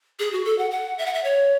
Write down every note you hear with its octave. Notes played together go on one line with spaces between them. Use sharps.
G#4
F#4
A4
F#5
F#5
E5
F#5
E5
C#5